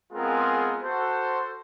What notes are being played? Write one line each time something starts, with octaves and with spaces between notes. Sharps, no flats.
G#3 B3 C4 F4 G#4 A#4
F#4 A4 C5